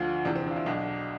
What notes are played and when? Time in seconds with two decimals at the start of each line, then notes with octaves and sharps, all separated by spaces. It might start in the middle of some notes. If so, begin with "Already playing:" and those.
Already playing: D2 D3 F3 F4
0.25 E2 C3 E3 D4
0.36 C4
0.46 D4
0.51 F4
0.56 E4
0.66 B1 B2 D4